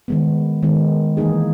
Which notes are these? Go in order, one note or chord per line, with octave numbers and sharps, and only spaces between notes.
D#3 G#3 B3
D#3 G#3 B3
E3 A#3 D#4 G#4